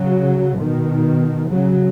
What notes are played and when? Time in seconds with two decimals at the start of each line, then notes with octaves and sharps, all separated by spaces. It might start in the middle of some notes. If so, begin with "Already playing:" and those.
Already playing: C#3 F#3
0.59 B2 D#3
1.49 C#3 F#3